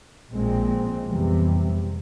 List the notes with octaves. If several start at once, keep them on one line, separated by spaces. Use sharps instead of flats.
A#1 A#2 G#3 C4
F1 E2 C3 E3 G3